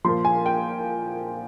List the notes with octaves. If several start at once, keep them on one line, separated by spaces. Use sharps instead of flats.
A#2 F3 C6
G#5
G5